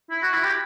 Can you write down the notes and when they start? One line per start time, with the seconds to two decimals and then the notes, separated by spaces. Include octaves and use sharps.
0.11 E4
0.22 F#4
0.33 E4
0.44 G4